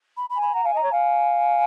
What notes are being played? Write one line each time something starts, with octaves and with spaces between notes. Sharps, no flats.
B5
B5
G#5
B5
F#5 A#5
F5 G#5
D#5 A#5
C#5
F5 G#5